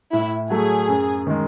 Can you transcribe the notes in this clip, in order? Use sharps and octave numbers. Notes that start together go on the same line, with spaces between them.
A2 E4
F#3 A3 G#4
F#2
D#3 G#3